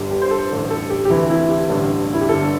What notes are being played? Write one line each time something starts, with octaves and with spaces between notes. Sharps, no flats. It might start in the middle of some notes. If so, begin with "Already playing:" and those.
Already playing: G1 G2 D3 G4
G4
C5
A4
A1 G2 D3
A4
G4
G4
D2 C3 E3 E4
E4
G4
A1 G2 D3
E4
G4
G1 G2 D3 A4